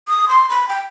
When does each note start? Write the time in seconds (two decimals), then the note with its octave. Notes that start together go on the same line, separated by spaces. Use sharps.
0.08 D#6
0.29 C6
0.49 B5
0.69 G5